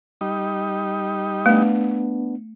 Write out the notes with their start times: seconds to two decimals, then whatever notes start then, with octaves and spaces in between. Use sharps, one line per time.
0.21 G3 D#4
1.46 A3 B3 D4